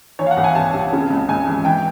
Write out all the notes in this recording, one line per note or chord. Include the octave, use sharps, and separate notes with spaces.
E3 C#5
F5
F#5
C2
G#5
C2 A5
C3
C#3
C#2
C#2 G#5
E3
E3 G5